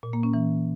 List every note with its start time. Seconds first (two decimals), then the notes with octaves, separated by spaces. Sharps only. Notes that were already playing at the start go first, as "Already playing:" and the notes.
0.03 A#2
0.13 A#3
0.23 C#4
0.34 E3